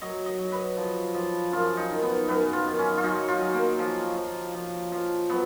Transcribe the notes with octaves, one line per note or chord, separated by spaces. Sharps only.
F#3 D#5
D#5
F#3
B4
F3
F3
F#2 F4
D#4
D#3
B3
F#2 B3
F4
D#3
C#4
F4
F#3 D#4
F4
F#3
A#3
F3
F3
F3
F3
F#3 B3